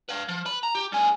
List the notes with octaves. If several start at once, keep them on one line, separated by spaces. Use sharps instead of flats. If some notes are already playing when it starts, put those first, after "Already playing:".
B4 F5
F3
B4 B5
A#5
G4
G2 G#4